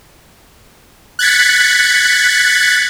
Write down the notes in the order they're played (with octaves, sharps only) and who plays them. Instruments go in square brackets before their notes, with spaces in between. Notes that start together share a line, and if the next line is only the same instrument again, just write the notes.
[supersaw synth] F#6 G#6 A6 B6 C#7